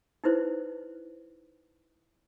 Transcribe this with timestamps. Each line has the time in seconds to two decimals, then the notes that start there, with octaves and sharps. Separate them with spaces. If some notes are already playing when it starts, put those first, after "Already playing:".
0.24 D#4 E4 B4 C5